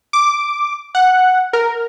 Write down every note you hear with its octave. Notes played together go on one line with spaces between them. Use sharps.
D6
F#5
A#4